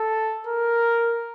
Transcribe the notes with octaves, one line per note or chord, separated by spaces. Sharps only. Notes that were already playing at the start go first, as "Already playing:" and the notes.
Already playing: A4
A#4